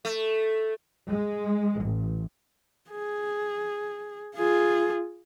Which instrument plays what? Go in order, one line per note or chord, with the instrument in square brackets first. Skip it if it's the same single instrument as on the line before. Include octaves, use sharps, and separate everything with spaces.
[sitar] A3
[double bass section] G#3
A1
[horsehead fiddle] G#4
F4 G#4